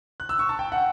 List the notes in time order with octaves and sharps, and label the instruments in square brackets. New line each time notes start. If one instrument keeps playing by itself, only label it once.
[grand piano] F#6
E6
C#6
A5
G5
F#5